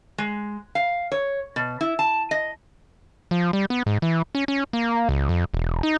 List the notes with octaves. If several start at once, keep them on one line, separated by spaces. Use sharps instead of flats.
G#3
F5
C#5
B2
E4
A5
D#5
F3
G3
B3
G#2
E3
C#4
C#4
A#3
C#2
F2
E1
D#4